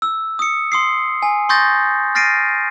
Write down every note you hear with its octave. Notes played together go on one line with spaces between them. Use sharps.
E6
D#6 C#7
C6 D#6 C7
G#5
C6 C#6 D#6 G6 A6 A#6
F6 A6 A#6 C7 D7 D#7